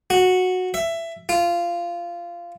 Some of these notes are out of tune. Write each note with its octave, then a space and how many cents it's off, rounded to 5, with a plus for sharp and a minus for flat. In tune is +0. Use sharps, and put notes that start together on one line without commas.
F#4 -10
E5 +15
F4 -15